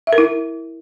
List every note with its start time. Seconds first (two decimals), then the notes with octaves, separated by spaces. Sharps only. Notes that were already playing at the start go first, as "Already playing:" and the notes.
0.07 E5
0.13 A#4
0.18 E4